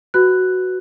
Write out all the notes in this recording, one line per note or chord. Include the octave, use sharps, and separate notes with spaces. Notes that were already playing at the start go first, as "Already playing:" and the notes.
F#4 B4 F#6